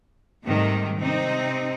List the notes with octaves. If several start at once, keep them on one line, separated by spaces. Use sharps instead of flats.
G#2 C3 D#3 G3 A3
C3 C4 D#4